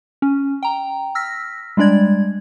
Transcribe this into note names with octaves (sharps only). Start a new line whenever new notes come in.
C#4
G5 A#5
E6 F6 A#6 B6
G3 G#3 D4 D5 G#6